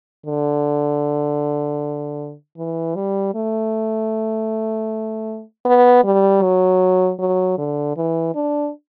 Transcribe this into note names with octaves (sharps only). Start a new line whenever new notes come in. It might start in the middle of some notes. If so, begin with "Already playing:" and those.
D3
E3
G3
A3
B3
G3
F#3
F#3
D3
E3
D4